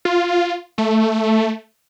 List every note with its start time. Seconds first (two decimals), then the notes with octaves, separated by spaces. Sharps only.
0.05 F4
0.78 A3